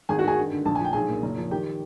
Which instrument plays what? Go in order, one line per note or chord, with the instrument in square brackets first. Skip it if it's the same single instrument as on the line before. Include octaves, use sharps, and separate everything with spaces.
[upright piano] G#1 G#4 G#5
F#4 F#5
D#3 G#4 G#5
G2
D3
A#1 A5
G#5
F3 G5
B1 G#4 G#5
A#2
F#1
F3
D#3 G4 G5